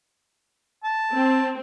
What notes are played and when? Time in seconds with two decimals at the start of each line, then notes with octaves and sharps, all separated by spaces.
0.84 A5
1.13 C4